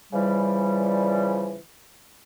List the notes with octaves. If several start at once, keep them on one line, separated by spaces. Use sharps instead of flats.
C#3 E3 F3 G3